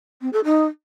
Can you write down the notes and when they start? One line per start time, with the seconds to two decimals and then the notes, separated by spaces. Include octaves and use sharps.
0.21 C4
0.32 A4
0.44 D#4